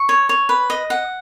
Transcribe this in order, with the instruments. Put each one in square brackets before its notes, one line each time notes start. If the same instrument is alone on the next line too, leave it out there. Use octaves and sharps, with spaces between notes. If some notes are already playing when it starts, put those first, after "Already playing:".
Already playing: [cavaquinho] C#6
C#5
C#5
B4
D#5
F#5